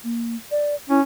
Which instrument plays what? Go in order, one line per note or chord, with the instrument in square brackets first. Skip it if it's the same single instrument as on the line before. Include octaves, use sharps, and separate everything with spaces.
[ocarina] A#3
D5
[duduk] C#4 [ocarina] E4